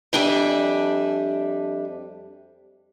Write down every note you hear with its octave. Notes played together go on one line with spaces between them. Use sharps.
F2 G3 D4 E5 G#5